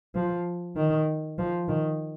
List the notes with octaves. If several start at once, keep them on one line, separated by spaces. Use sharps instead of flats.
F3
D#3
F3
D#3